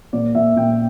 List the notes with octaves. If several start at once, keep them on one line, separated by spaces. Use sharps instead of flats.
A#2 D5
A#2 E5
A#2 G5